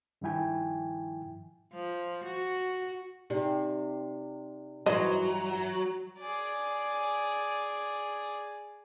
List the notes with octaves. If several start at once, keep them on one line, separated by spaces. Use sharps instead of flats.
G2 D#3 F3 E4 G5 G#5
F3
F#4
C3 D#4 G4 D5
G2 E3 F#3 C5 D#5
G#4 D5